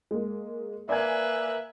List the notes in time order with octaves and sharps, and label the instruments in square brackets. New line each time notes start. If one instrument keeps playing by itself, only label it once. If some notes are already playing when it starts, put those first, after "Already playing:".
[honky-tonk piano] G#3 A#3
[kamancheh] A#3 B4 [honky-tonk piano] D5 G#5 G#6 [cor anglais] E5